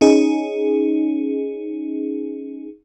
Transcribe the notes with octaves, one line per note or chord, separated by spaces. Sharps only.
C#4 D#4 G#4